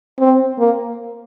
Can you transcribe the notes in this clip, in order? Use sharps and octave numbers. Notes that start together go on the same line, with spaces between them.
C4
A#3